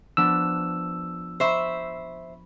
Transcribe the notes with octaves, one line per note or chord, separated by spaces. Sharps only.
F3 B3 D4 E6
C5 E5 B5 C#6 B6